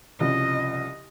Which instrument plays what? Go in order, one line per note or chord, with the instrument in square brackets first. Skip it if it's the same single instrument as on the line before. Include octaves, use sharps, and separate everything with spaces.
[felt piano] C2 C#3 F3 [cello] D#5